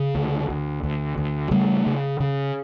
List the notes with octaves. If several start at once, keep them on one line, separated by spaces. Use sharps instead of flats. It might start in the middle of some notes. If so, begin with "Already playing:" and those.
Already playing: C#3
D2
D2
D2
D2
C#3 G3 A3
C#3
C#3